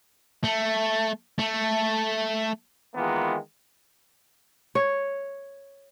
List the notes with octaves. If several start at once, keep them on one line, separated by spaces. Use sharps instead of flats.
A3
A3
D#3 E3 G#3 A#3 B3 F4
C#5